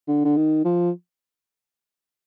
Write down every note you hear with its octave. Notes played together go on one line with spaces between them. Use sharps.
D3
D3
D#3
F3